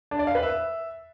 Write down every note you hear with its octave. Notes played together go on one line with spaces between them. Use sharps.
D4
D5
F5
B4
E5